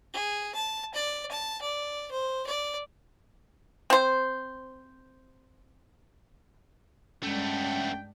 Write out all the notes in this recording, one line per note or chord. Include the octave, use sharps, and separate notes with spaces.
G#4
A5
D5
A5
D5
C5
D5
C4 C5
G2 G#3 A3 B3 C#4 D4 G5